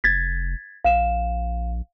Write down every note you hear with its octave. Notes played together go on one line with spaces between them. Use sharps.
F1 G#6 A6 B6
A#1 F5 E7